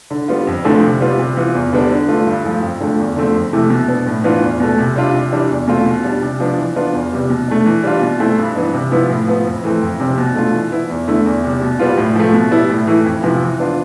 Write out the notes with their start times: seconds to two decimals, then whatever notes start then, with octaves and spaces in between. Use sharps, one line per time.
0.11 D3
0.28 G3 B3 F4
0.47 F2
0.65 D3 F3 A3 C4
0.83 C3
1.01 G3 B3 F4
1.19 C3
1.37 E3 B3 F4
1.55 E2
1.73 D3 G3 B3 D4
1.91 D3
2.09 A3 D4 F4
2.27 G2
2.44 F3 A3
2.62 F2
2.80 D3 F3 A3
2.99 E2
3.16 D3 F3 A3 C4
3.35 F2
3.53 C3 E3 A3 E4
3.70 B2
3.88 B3 D4
4.06 A2
4.24 E3 B3 D4 F4
4.42 E2
4.60 B2 A3
4.78 C3
4.96 G3 D4 F4
5.14 C3
5.32 E3 G3 D4
5.50 E2
5.68 B2 A3 C4 F4
5.86 B2
6.04 G3 D4
6.22 C3
6.40 F3 B3 D4
6.58 E3
6.76 B3 D4 F4
6.94 E2
7.12 C3 G3
7.30 B2
7.48 A3 D4
7.66 E3
7.84 G3 D4 F4
8.02 B2
8.20 A3 C4 E4
8.38 G2
8.56 E3 B3 D4
8.74 C3
8.91 F3 B3 E4
9.10 A2
9.28 F3 B3
9.46 F2
9.64 E3 A3 C4
9.82 F2
10.00 C3 G3 C4
10.18 B2
10.35 A3 D4 F4
10.54 E3
10.72 B3 E4
10.90 E2
11.08 D3 A3 E4
11.26 E2
11.44 C3 G3
11.62 B2
11.79 G3 B3 F4
11.97 A2
12.16 F3 A3
12.34 B2
12.51 G3 B3 E4
12.70 A2
12.87 E3 A3 E4
13.05 F2
13.23 C3 F3 B3 E4
13.41 E3
13.59 B3 D4 F4